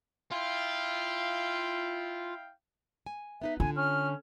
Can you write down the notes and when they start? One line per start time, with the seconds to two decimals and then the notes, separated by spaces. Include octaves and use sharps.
0.31 E4 F4 F5 G5
3.06 G#5
3.42 B3 D#4 B4 E5
3.60 D3 F4 G#5
3.77 C#4 F6